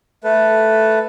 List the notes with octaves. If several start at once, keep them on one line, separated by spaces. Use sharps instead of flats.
A3 A4 B4